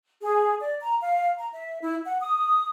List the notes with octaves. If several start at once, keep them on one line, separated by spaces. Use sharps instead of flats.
G#4
D5
A#5
F5
A#5
E5
E4
F#5
D#6